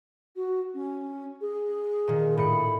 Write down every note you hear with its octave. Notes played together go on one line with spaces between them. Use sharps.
F#4
C#4
G#4
A#2 D#3
A2 B5 C#7